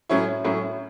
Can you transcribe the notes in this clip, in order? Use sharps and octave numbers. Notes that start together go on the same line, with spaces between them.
A2 F#3 C#4 E4 C#5
A2 F#3 C#4 E4